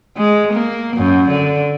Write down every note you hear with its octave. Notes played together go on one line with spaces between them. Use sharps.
G#3
A#3
F#2
D3